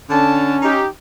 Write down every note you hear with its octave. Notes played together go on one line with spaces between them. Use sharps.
D3 C#4 A5
D#4 G4